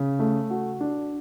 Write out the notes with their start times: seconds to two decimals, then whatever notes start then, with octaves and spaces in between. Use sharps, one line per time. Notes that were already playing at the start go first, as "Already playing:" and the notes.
Already playing: C#3
0.19 A3
0.50 F#4
0.81 D4